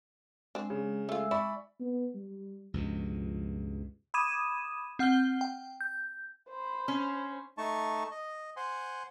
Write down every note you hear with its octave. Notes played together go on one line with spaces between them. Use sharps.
G#3 C4 D4
C#3
G#3 A3 F4 E5 E6
E4 D5 B5 C#6
B3
G3
C#2 G2 B2 F3
B5 D6 D#6 G#6 D#7 E7
C4 F#5 F6 G6 G7
G5
G6
C5 B5
C#4
A3 D#4 A5 C#6
D#5
C5 F#5 G#5 C6